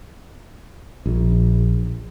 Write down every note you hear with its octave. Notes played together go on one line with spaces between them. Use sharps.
A#1